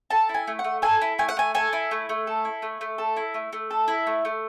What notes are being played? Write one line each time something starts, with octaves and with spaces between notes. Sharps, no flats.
A4 A5
E4
G#5
A3
F#5
A3
A4 G#5
E4
A3 G#5
F#5
A3 G#5
A4 G#5
E4
A3
A3
A4
E4
A3
A3
A4
E4
A3
A3
A4
E4
A3
A3